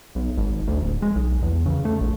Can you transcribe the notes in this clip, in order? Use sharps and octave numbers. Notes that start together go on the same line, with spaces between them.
B1
G#1
D2
D1
G#3
B1
E2
C#3
A3
A#1